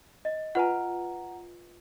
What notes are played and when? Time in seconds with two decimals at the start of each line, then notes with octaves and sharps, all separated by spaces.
0.25 D#5
0.55 F4 B4 F#5 G#5 A#5